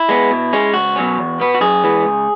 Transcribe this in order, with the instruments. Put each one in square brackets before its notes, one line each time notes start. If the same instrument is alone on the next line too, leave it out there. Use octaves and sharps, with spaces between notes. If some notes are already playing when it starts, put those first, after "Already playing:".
Already playing: [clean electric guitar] E4
G#3 B3
B2
G#3 C#4
C#2 F#4
B2 F#3 C#4
E2
B2 B3
F#4
F#2 G#4
E3 G#3 B3
C#2